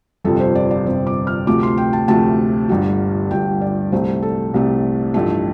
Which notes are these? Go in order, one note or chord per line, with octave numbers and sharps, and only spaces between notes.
G1 F2 C3 F3 A4
C5
D5
D5
G1 F2 C3 F3 C5
D6
F6
D2 C3 F3 A3 D6
C6
G5
A5
D2 C3 F3 A3 A5
G1 G2 D3 G3
G1 G2 D3 G3 G5
D5
C2 C3 A3 C5
A4
C2 C3 A3
A1 G2 F3 A3